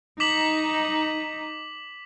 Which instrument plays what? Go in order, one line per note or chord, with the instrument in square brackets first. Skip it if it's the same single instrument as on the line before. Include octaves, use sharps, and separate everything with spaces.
[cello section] D#4 [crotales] D6 B6 F#7